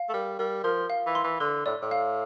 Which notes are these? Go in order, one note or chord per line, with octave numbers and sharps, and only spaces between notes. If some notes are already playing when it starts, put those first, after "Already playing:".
Already playing: F5
A3
G3 A#4
G3 A#4
F3 A#4
F5
E3
C6
E3
D3 C6
A2 D5
A2
F5